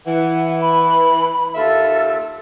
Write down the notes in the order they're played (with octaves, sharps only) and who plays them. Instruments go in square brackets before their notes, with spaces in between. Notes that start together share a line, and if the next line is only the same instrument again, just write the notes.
[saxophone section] E3 [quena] F#5
[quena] B5
[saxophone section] D#2 F4 E5 [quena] A4